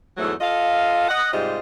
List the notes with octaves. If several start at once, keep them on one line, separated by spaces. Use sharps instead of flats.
E2 G#2 F#3 A3
F4 A4 D#5 F5
D#5 F#5
G#2 C3 G3 F4 D#5